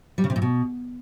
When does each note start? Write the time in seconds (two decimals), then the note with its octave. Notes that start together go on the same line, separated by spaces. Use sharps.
0.18 G3
0.24 C#3
0.30 C3
0.36 A#2
0.42 B2